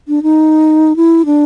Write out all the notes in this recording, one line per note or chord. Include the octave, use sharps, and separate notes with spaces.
D4
D#4
E4
D4